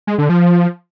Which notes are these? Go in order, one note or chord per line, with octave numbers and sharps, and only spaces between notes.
G#3
D3
F3